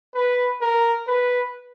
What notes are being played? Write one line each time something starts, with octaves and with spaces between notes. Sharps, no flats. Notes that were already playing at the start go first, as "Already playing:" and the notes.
B4
A#4
B4